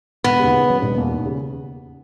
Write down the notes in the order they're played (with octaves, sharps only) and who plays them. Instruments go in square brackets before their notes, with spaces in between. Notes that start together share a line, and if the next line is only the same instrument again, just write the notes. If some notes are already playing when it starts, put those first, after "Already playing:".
[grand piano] E1 [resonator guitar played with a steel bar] B3
[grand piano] D#2 C#3
C#3
F#3 C#4
E1
E2 B2 A#3
D#2
C#3